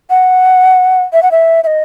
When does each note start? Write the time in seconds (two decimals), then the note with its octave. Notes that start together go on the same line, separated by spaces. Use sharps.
0.10 F#5
1.13 E5
1.23 F#5
1.31 E5
1.64 E5
1.67 D#5